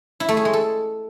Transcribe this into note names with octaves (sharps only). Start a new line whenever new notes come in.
E4
A3
G#4
G#3
A4